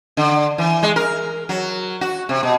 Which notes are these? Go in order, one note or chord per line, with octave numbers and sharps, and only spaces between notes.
D3
E3
G#3
A#4
F#3
F#4
C3
B2